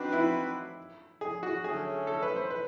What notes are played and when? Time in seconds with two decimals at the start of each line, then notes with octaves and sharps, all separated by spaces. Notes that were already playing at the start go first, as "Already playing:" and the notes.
Already playing: C4 D4 D#4 F#4 B4
0.13 E4
1.21 G#4
1.43 F#4
1.64 D3 F#3 A3 C#4 G#4
2.07 A4
2.22 B4
2.36 C5
2.50 B4